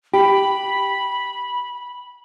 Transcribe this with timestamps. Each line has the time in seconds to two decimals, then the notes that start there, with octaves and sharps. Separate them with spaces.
0.14 G4 B5